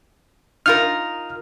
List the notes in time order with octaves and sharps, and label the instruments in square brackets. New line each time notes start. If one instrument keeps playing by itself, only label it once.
[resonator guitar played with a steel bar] D#4 F4 A#4 [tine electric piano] F6